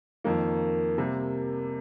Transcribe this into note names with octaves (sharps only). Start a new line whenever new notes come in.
F2 D#3 A#3
C3 G3 A#3